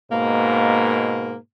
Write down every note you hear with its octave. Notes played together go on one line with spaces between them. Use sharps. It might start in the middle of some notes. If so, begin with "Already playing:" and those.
G#2 B2 A#3